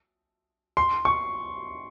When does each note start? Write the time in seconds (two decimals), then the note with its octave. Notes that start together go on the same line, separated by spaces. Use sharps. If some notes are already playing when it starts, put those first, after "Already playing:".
0.77 C6
1.05 C#6